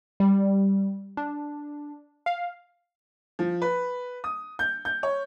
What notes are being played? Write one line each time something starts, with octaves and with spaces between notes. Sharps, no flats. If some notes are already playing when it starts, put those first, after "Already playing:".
G3
D4
F5
F3
B4
D#6
G6
G6
C#5